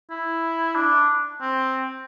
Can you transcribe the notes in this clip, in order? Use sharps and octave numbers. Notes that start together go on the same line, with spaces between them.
E4
D4
C4